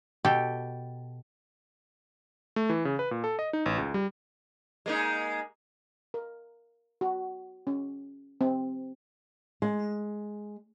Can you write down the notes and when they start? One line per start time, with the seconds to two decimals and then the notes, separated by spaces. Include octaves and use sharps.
0.25 B2 G4 A4 G5
2.56 A3
2.69 E3
2.85 C#3
2.99 B4
3.11 A#2
3.24 A4
3.39 D#5
3.53 D#4
3.66 A1
3.78 C#2
3.94 G3
4.86 G#3 A#3 D#4
6.14 A#4
7.01 F#4
7.67 C#4
8.41 C4
9.62 G#3